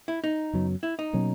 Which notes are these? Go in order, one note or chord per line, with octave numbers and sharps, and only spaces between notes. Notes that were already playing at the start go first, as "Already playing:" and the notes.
E4
D#4
F#2 C#3 F#3 B3
E4
D#4
B2 F#3 A#3 C#4